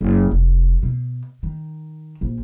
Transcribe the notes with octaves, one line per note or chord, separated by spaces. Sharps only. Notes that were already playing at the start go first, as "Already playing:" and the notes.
F#1
F1
B2
D#3
A#1